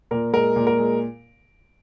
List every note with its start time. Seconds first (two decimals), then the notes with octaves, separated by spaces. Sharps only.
0.11 A#2 A#4
0.33 G#3 A#4
0.56 A#2
0.67 A#4
0.78 G#3